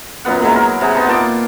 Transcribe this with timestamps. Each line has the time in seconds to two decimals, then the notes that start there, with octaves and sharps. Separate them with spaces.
0.25 F#2 A#2 B3 F#5
0.42 F#3 G#3 E4
0.56 A#4
0.81 C3 G#4 F#5
0.95 B3 D#4 A5 C6
1.07 A#2 A5 D6